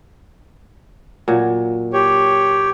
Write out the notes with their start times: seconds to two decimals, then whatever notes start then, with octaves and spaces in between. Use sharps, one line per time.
1.28 A#2 F#3
1.93 G4 C#5